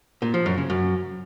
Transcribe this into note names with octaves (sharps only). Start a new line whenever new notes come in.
A#2
F3
F#2
C#3
F#2